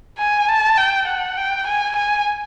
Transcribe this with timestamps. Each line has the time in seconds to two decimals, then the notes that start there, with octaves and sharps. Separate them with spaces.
0.19 G#5
0.48 A5
0.77 G5
1.08 F#5
1.37 G5
1.67 G#5
1.96 G#5